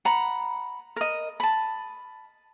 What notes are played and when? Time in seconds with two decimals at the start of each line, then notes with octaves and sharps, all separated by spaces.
0.05 F#5 A#5 B5
0.96 A#4 D#5
1.40 A5 B5